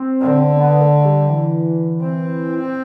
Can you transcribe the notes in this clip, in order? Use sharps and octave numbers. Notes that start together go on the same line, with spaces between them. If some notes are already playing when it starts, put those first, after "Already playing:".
Already playing: C4
D3
B3
A3
G3
E3
C4